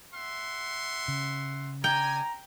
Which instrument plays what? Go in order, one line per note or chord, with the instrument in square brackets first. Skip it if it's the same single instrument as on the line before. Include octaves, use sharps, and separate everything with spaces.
[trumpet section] E5 F#5 C6
[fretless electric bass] C#3
[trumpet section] D5 G#5 [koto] G5 [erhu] A#5